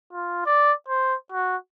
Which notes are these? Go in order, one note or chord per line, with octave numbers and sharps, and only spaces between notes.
F4
D5
C5
F#4